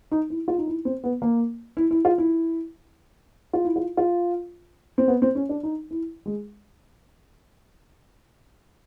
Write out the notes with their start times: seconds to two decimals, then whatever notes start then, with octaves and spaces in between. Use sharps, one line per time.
0.11 D#4
0.30 E4
0.48 F4
0.58 D#4
0.67 E4
0.85 C4
1.04 B3
1.22 A#3
1.77 E4
1.91 E4
2.05 F4
2.18 E4
3.53 F4
3.65 E4
3.76 F4
3.97 F4
4.98 C4
5.08 B3
5.22 C4
5.35 C#4
5.49 D4
5.63 D#4
5.91 E4
6.26 G#3